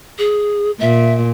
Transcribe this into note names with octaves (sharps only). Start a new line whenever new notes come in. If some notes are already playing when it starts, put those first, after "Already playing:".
G#4
A#2 E5